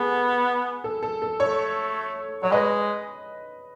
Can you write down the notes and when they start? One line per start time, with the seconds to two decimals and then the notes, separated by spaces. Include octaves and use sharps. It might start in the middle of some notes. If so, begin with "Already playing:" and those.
Already playing: B3 G#4 A4
0.84 A4
1.03 A4
1.22 A4
1.40 A3 A4 C#5
2.43 F#3 C#5
2.52 G#3 B4 D#5